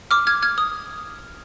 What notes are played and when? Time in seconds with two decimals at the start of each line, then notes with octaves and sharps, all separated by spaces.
0.11 D6 F6
0.27 F6 G#6
0.43 F6 G#6
0.58 D#6